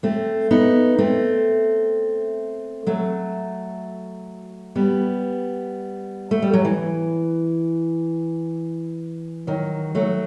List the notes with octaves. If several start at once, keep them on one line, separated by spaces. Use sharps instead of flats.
A3 C4
B3 D#4
A3 C4
F#3 A3
G3 B3
A3
G3
F#3
E3
D#3 F#3
F#3 A3